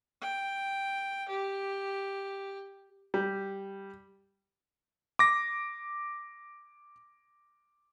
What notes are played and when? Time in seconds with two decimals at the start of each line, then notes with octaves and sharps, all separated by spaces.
0.21 G5
1.28 G4
3.14 G3
5.19 D6 A#6